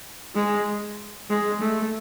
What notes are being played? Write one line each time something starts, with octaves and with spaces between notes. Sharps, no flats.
G#3
G#3
A3